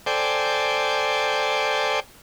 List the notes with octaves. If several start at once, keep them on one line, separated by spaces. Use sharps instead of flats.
A4 C5 D5 G5 G#5